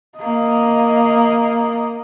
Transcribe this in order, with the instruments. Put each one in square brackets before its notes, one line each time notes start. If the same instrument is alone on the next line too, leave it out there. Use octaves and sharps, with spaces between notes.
[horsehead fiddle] A#3 D#5